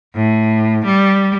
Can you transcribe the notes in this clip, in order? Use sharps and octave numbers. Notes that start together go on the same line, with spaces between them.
A2
G3